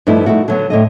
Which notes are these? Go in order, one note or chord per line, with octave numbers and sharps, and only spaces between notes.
G2 F3 A3 D#4 E4
F3 A3 D#4 E4 F#4
D3 F#3 B3
A2 D3 D#5